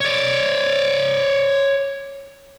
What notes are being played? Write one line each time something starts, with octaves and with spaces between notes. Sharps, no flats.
C#5 D5